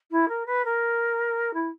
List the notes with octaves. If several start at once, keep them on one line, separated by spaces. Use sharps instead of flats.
E4
A#4
B4
A#4
E4